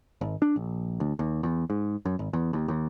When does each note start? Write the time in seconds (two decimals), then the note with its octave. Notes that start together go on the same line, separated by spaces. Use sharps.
0.21 G#1
0.42 D4
0.56 A#1
1.00 D2
1.19 D#2
1.43 E2
1.70 G#2
2.05 F#2
2.19 G#1
2.33 E2
2.53 D#2
2.68 D#2